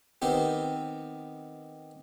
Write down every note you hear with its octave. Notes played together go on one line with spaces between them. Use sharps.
D#3 B3 C4 G4